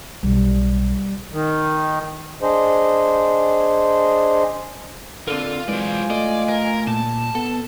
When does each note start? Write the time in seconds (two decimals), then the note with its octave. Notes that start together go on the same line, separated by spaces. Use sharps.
0.23 B1 G3
1.32 D#3
2.42 D4 G#4 C5 D#5
5.28 D3 C4 F4 A4 A#4
5.68 E3 F#3 G#3 F4 C5 D5 G#5
6.10 A3 D5 D#5
6.49 A#4
6.87 A#2 A5
7.35 B3 A4